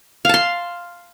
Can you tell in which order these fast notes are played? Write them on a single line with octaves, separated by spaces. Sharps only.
F5 A5 C6